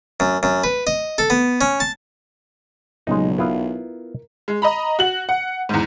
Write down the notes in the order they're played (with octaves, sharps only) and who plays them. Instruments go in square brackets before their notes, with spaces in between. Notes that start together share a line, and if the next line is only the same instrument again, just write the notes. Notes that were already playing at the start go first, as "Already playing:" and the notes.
[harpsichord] F#2
F#2
B4
D#5
A4
B3
C#4
A5
[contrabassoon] B1 [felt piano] A#2 C#3 F#3 [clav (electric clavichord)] G#3 D#4
[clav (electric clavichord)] B3 E4 F4 [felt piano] A#4
[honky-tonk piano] G#3
D#5 A#5 B5
F#4 F#7
F#5
E2 G#2